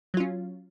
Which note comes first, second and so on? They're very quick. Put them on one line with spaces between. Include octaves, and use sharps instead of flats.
F#3 F4 C#4